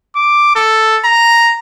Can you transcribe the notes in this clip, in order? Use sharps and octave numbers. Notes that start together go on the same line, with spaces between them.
D6
A4
A#5